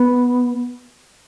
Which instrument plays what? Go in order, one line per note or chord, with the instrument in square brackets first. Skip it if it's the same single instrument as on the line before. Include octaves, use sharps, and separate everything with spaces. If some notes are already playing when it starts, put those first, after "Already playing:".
Already playing: [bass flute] B3